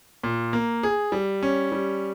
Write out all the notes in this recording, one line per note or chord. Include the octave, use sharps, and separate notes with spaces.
A#2
A#3
G#4
G3
C#4
G3